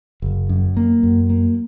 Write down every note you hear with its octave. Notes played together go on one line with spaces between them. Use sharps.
F#1
F#2
A#3
F#2
A#3